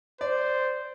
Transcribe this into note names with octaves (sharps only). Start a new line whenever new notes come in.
C5 D5